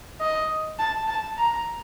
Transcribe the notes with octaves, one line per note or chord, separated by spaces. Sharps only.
D#5
A5
A5
A#5